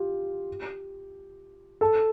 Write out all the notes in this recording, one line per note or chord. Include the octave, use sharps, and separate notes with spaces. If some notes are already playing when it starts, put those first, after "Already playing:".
Already playing: F4 G4
A4